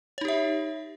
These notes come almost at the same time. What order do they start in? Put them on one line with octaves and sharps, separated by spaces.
C#5 D#4 G4 E5